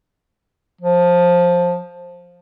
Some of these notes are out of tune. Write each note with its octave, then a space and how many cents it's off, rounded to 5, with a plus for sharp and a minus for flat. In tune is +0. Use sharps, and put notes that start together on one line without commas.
F3 +15